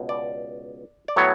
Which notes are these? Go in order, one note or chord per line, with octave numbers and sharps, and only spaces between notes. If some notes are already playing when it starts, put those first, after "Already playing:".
Already playing: C#2 B2
D5
D5
A2 F#3 B3 C#5